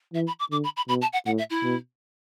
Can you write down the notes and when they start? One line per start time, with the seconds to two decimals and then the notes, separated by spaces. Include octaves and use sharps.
0.14 E3 E5
0.27 B5
0.40 D6
0.51 D3 D6
0.64 B5
0.77 B5
0.88 B2 B5
1.02 A5
1.13 F#5
1.26 A2 F#5
1.38 E5
1.50 E4
1.63 B2